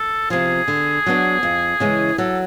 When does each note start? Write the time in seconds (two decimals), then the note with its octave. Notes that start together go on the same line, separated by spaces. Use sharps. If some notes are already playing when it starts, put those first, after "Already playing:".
Already playing: A4
0.30 C3 F3 G#4
0.68 D3
1.06 F#3 B3 D4
1.43 F2
1.80 C#3 E3 G#3 C#4
2.18 F#3 A4